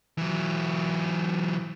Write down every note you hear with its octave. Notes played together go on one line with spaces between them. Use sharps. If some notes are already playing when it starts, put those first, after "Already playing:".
E3 F#3